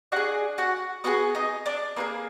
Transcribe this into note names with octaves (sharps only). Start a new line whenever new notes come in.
D4 F#4 G#4 F#5
F#4 F#5
B3 F4 F#4 G#4 F#5
D#4 D#5
D4 D5
A#3 D#4 G#4 B4